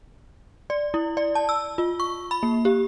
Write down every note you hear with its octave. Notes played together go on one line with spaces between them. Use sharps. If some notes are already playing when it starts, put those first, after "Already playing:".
D5
E4
D5
A5
E6
F4
C#6
B5
A#3
G4